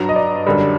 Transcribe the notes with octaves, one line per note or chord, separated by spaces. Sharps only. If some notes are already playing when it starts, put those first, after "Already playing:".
Already playing: G2 F#3 A#5
D#5
D5
F#2 D3 G3